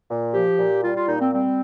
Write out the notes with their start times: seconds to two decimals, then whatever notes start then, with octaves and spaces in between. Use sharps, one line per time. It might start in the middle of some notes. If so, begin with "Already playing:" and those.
0.10 A#2
0.34 F3 G4
0.59 A#2
0.83 G3 F4
0.95 F4
1.08 A#2 D#4
1.20 C4
1.32 G3 C4